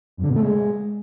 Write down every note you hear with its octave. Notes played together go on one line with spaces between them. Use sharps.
F#2
D3
B2
A3
G#3